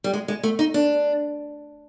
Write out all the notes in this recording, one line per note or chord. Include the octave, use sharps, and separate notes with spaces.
G3
G#3
G#3
A3
D#4
D4